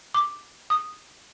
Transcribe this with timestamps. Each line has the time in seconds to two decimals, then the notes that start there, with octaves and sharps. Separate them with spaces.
0.14 D6
0.70 D#6